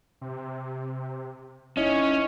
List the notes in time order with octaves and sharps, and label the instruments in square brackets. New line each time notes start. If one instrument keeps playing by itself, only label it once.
[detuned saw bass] C3
[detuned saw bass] F#1 [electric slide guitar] C#4 [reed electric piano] D#4 E4 D#5